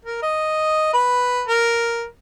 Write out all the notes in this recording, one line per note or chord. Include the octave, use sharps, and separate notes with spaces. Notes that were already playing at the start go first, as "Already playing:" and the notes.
A#4
D#5
B4
A#4